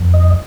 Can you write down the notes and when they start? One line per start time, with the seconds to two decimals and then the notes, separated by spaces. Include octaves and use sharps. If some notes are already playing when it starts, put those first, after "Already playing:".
Already playing: F2
0.14 D#5